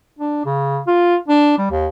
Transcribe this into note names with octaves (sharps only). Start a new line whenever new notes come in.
D4
C#3
F4
D4
G3
D#2